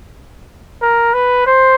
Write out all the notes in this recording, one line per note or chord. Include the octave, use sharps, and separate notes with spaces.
A#4
B4
C5